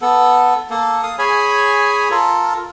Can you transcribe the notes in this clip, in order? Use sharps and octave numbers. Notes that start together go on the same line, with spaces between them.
B3 A4
A#3 A4
F5 D#6
G#4 C#5 G#5 B5
F4 A4 A#4